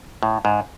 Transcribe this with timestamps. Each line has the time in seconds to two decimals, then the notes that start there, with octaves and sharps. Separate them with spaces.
0.23 A2
0.45 G#2